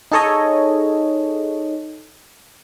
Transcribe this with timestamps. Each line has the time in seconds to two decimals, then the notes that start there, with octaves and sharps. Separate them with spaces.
0.12 D#4 G#4 A4 C#5 D#5